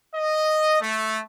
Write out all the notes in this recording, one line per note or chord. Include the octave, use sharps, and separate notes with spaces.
D#5
A3